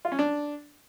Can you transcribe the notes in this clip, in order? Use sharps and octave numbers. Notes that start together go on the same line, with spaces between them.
F4
C#4
D4